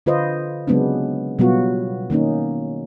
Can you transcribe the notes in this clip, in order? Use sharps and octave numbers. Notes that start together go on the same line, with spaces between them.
D3 F4 B4 C5 D#5
C#3 F#3 G#3 B3 C4 D4
B2 F#3 G3 B3 F4 F#4
D#3 A#3 C#4 D#4